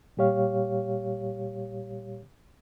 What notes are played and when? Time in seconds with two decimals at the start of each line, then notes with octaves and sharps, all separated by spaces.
0.17 A#2 G3 G4 C#5 F5